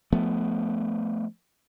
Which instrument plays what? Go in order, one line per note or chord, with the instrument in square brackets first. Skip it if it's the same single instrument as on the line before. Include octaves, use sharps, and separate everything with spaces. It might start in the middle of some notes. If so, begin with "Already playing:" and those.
[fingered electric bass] F3 A3 B3